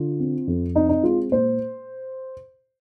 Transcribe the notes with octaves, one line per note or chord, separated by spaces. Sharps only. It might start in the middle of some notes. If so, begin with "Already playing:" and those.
Already playing: D3 F4
C4
F2
C4 D#4
D#4
G#3 F4
A#2 C5